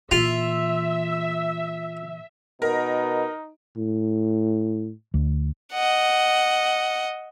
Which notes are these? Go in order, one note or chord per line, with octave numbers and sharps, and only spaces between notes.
A#2 E3 F4 E5
B2 D#4 A#4
A2
D2
D#5 F#5